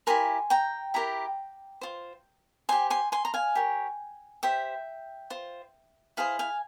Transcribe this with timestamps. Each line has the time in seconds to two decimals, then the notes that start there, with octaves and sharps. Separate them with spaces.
0.07 E4 G4 A#4 G#5 C6
0.50 G5 A#5
0.94 E4 G4 A#4 G5 A#5
1.81 F4 C5
2.69 G4 C5 G#5 C6
2.90 G#5 C6
3.12 G#5 C6
3.25 A#5
3.34 F5 G#5
3.55 G4 A#4 C#5
4.43 G4 C5 E5 G5
5.30 F4 C5
6.17 E4 G#4 C5 F5
6.39 F5 G#5